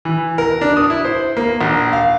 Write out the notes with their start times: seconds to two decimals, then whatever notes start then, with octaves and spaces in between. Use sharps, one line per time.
0.05 E3
0.38 A#4
0.61 D4
0.77 D#6
0.90 E4
1.05 C5
1.37 A#3
1.61 A#1
1.93 F5